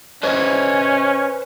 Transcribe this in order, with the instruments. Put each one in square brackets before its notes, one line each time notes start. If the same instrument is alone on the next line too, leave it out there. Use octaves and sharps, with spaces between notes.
[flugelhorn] C#4 [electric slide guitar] B4 C5 D#5